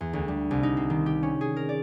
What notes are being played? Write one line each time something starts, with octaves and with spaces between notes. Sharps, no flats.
E2
D2
G3
C2
D#4
C4
D#3
G4
C#4
G#4
A#4
D5